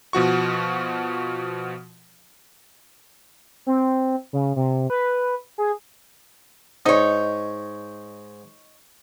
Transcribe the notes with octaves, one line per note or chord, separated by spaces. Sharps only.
B2 F3 F#4 C#6
C4
C#3
C3
B4
G#4
G#2 D#4 C#5